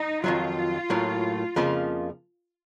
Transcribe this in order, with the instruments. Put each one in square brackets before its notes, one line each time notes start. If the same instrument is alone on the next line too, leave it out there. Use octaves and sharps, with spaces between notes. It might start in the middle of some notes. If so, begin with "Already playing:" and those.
Already playing: [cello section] D#4
[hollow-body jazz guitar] F2 D#3 F#3 [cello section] F4
[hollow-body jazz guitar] A2 F#3 A#3
F2 C#3 F3 A#3 F4